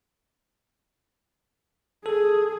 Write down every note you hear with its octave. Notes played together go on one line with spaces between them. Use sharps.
G#4 A4